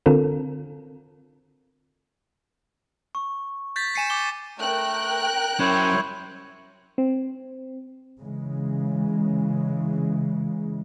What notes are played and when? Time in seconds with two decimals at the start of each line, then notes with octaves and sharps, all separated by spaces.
0.06 D3 C4 F4 A4 A#4
3.15 C#6
3.76 G6 A6 B6
3.95 G#5 C7 C#7 D#7 E7
4.10 D6 G7
4.58 A3 A#4 G5 F#6
5.59 F#3 C#4 E4 C5 C#5
6.98 C4
8.22 C#3 E3 G#3